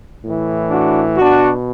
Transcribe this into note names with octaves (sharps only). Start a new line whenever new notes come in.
A2 E3
D4 F#4
B2 D4 F#4